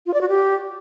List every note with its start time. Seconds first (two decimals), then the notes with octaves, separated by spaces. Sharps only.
0.06 F4
0.14 D5
0.21 F#4
0.29 G4